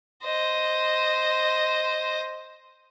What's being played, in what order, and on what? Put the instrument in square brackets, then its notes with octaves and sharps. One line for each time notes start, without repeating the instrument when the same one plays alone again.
[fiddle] C5 D#5